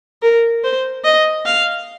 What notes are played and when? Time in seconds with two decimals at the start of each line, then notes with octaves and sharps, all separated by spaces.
0.22 A#4
0.64 C5
1.05 D#5
1.46 F5